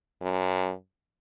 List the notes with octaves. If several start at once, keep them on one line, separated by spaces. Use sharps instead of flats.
F#2